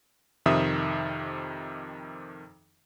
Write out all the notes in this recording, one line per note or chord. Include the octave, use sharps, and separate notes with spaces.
F2 C3 D#3 E5 D#6